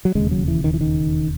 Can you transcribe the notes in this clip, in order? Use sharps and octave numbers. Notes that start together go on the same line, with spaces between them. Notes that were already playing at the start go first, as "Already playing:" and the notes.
F#3
E1 D#2 C#3 G#3
F#3
E3
D#3
E3
D#3